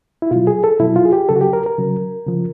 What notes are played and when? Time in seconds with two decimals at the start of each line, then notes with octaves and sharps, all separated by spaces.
0.22 E4
0.31 B2 F#3 F4
0.47 G#4
0.64 A4
0.79 B2 F#3 E4
0.96 F4
1.05 G#4
1.13 G4
1.29 C#3 F#3 A4
1.36 F#4
1.41 G4
1.53 A#4
1.66 A#4
1.78 C#3 F#3
2.26 C#3 F3